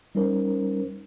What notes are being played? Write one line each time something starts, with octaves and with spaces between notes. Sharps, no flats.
G3 C#4 D#4 A#4 C5